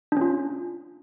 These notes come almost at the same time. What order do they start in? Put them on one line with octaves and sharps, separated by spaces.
D4 C#4 F4